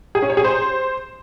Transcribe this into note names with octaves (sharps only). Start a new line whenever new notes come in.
G#4
C#4
C#5
G#4
C5